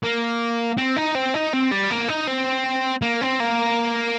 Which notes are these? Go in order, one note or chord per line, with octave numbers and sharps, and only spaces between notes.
A#3
C4
D#4
C4
D#4
C4
G3
A#3
D#4
C4
A#3
C4
A#3